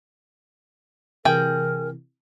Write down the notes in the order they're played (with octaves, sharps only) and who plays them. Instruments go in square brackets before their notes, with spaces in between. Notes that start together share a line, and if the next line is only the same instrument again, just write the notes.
[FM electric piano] C3 E3 [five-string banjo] G#4 G5 [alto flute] A#4